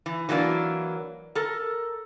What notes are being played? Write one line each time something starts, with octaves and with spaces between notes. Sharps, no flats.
E3
E3 F#3 A#3 D4
A4 A#4